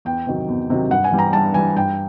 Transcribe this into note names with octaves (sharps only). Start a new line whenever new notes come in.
E2 G5
C3 D#3 F#3
E2
C3 D#3 F#3
G2 F#5
G#5
E3 G3
A#5
G2 A5
E3 G3 G#5
G2 G5